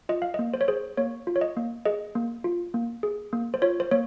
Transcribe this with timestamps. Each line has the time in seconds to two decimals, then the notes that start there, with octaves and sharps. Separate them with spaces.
0.09 F4 D#5
0.22 F5
0.34 D#5
0.39 A#3
0.54 C5
0.61 C#5
0.68 G#4 C5
0.97 A#3 C#5
1.27 F4
1.36 C#5
1.41 D#5
1.57 A#3
1.85 G#4 D#5
2.15 A#3
2.44 F4
2.74 A#3
3.03 G#4
3.33 A#3
3.54 C5
3.62 F4 C#5
3.80 C5
3.91 A#3 C#5